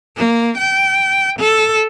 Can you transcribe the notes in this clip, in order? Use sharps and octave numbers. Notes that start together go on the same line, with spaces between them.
A#3
G5
A4